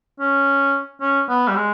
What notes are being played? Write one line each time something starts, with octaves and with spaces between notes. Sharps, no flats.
C#4
C#4
B3
G3
G#3